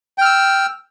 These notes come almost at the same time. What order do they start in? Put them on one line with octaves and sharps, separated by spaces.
G5 F6 E6